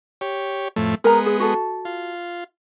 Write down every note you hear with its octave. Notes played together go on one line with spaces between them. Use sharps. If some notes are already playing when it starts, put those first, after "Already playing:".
G4 C#5
F2 A2 A3
G#3 B3 A#4 A#5
G#4
F#4 A4
F4